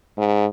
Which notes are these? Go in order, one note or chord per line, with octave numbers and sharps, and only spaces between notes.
G#2